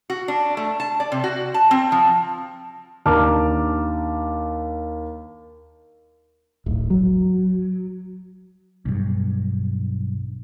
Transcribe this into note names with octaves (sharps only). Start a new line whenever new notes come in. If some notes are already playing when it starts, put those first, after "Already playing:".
F#4
D4
A3
A5
D5
C3
F#4
A5
C4
F3
D#2 D4 A5 A#5 D6 F6
D1 G#1
F#3
B1 G2